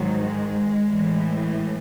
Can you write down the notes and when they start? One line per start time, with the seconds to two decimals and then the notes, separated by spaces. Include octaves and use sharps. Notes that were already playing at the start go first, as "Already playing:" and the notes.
Already playing: G#2 D#3 F#3
0.24 G#3
0.90 A2 E3